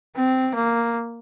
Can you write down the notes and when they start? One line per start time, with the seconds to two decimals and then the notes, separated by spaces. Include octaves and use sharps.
0.16 C4
0.55 A#3